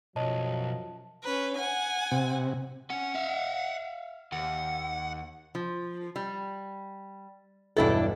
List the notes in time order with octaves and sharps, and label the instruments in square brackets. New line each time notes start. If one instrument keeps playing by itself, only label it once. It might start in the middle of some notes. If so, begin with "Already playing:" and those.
[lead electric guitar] B1 [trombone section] F#2 F3 [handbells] C#5 D#5 [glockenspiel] A5
[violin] C#4 B4
F#5 G#5
[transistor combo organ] C3
[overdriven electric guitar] C#4 [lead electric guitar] F#5
[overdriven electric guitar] E5 F5
[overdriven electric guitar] D#2 [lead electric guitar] F#5
[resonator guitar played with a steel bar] F3
G3
[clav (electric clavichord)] B1 E2 G2 [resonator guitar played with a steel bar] D4 E4 A4